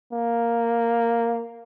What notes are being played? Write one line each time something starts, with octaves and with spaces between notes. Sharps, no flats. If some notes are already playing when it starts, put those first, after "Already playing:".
A#3